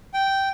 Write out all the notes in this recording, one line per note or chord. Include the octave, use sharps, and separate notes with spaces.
G5